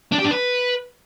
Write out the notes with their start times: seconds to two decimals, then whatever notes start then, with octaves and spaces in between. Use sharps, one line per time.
0.12 D4
0.19 G4
0.25 D4
0.31 B4